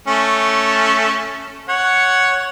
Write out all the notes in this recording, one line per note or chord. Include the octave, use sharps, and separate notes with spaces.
A3 C#4
C#5 F#5